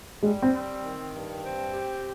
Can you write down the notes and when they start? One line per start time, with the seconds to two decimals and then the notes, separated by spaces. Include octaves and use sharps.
0.23 G3 G#3
0.42 C4
0.53 C4
0.83 D#3
1.13 G2
1.43 C4
1.74 G4